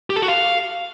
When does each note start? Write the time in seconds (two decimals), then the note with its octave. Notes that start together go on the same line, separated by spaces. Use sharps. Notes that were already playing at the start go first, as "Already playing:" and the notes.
0.10 G4
0.16 A4
0.22 F#4
0.28 F5